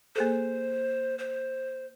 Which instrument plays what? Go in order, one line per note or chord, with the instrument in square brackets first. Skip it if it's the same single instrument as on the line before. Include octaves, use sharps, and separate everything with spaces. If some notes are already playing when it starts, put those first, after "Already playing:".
[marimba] A#3 G#4 A4 [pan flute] C5
[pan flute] C5